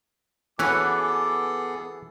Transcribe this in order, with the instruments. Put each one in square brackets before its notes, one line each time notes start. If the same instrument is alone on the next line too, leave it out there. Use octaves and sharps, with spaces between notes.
[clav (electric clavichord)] E3 [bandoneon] B3 G#4 A4 [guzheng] F#4 B4 C#5 [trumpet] D6